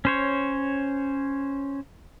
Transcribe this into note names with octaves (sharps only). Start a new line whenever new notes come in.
C#4 C5 C#5